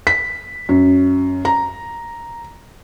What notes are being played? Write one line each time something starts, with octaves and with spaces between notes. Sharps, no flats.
B6
F#2
A#5